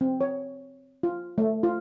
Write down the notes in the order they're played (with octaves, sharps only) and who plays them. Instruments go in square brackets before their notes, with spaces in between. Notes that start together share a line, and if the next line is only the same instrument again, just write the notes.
[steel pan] C4
C#5
F4
A3
F4